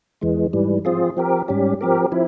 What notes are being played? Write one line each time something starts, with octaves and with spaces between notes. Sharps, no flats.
E2 E3 G#3
G#2 E3 G3
F3 C4 F4 G#4
F3 C4 G4 A#4
G#2 G3 C#4 G4
F3 C4 G4 A#4
F3 C4 E4